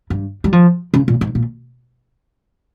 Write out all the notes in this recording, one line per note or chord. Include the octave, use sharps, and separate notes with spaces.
G2
G3
F3
C#3
A#2
G#2
A#2